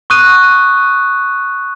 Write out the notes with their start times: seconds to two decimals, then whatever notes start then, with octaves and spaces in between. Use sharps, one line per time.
0.10 C#6 D#6 F#6 D#7